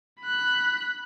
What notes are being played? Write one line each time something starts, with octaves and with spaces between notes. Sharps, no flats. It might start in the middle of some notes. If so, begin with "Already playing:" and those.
B5 F#6